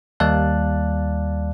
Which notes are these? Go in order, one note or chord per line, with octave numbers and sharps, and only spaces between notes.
D#2 G3 D5 F5 A5 F#6